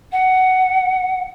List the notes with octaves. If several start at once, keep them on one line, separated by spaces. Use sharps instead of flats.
F#5